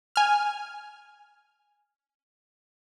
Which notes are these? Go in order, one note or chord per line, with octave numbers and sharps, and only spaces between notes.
G#5 F6